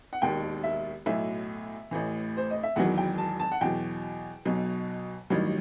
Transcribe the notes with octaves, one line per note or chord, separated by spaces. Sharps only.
F#5
E1 D#2 D#3 G5
E5
B1 A2 F#3 E5
A1 A2 E3
C5
D#5
E5
E1 E2 D#3 F#3 F#5
G5
A5
A5
F#5
E2 B2 F#3 G5
B1 B2 F#3
A1 G2 D#3 F#3